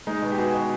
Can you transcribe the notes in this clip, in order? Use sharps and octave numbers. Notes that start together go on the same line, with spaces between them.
G#3 D#4
B2
G4
B3 F#4 G#4
B2